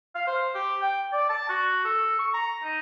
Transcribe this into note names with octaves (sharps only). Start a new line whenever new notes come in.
F5
C5
G4
G5
D5
A5
F#4
A4
C#6
A#5
D#4